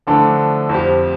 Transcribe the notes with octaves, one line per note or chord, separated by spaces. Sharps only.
D3 F3 A3 D4 A4
F2 F3 C4 G4